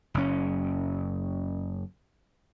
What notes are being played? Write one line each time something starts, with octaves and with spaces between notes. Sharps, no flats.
F#1 C#4